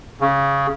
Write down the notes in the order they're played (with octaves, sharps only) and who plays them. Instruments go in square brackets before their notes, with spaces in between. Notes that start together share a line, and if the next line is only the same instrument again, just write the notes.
[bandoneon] C#3